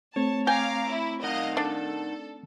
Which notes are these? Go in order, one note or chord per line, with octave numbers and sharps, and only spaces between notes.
A3 C4 C#5 A5
F5 G5 G#5 A#5 D6
E4
D#4 A#4 D#5 F5 F#5
D4 A4